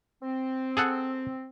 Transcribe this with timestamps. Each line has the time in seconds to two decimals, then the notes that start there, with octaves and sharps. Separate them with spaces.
0.23 C4
0.77 G#4 A4 F#5